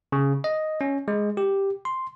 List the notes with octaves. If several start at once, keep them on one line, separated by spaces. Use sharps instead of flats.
C#3
D#5
C#4
G#3
G4
C6